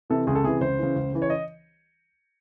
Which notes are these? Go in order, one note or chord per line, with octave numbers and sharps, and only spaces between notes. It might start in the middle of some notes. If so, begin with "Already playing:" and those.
C3 E3 A4
C#2 G#4
A4
C3 E3 G#4
C#2 C5
C#3 E3
C#2
C#3 E3
C#5
D#5